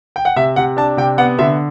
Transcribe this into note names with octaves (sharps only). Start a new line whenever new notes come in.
G5
F#5
C3 E5
C3 F#5
D4 A5
C3 G5
B3 F#5
D3 E5